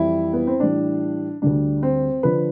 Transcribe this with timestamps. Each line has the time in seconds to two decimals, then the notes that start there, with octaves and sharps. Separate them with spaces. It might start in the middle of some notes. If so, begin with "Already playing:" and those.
Already playing: F2 E3 G3 E4
0.33 B3
0.47 C4
0.60 A2 E3 G3 D4
1.42 D2 D3 G3 D4
1.83 C4
2.23 D3 F3 B4